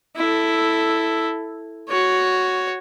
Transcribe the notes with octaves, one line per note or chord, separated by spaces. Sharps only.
E4 A4
F#4 C#5